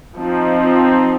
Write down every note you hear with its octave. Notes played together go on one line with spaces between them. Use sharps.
F3 C4 D#4